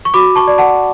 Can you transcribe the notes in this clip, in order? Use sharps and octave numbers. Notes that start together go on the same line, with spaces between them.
C#6
F#4 B5 D6
A5 C#6
D5
F#5 A5